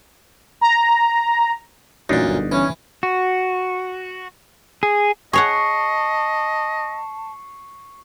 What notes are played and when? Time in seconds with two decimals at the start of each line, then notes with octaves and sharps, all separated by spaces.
0.61 A#5
2.09 A1 F#2 A#2 D4 D#4
2.28 G1
2.52 E3 C#4
3.03 F#4
4.83 G#4
5.33 G#4 C#5 D#5 F#5 A5 C#6 C7 C#7